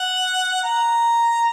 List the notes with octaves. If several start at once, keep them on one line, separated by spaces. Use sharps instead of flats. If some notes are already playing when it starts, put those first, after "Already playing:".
Already playing: F#5
A#5